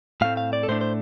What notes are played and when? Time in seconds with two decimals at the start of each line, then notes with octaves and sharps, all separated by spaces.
0.21 A2 A3 C4 F5
0.37 F5
0.53 D5
0.63 A4
0.68 A2 A3 D4 C5
0.81 C5